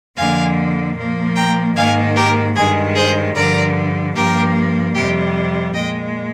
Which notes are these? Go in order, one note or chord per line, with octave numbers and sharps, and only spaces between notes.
F2 D3 F3 A#3 F5 G#5
A#2 F3 A#3
G5 A#5
G#2 D#3 A#3 F5 G#5
G4 A#4
G2 D#3 G#3 G#4
G#4 C5
G2 D3 F3 A#4 D5
G2 F3 A#3 G4 A#4
F2 C3 G3 G4
A#2 G#3 D#5 G5